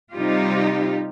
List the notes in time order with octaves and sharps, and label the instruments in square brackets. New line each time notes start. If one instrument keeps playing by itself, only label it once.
[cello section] C3 G3 D#4 F4 G4